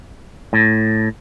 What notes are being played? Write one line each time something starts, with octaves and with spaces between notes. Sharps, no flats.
A2